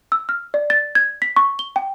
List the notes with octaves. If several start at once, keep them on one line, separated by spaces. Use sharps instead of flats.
E6
F6
D5
A6
G#6
B6
C#6
G7
G5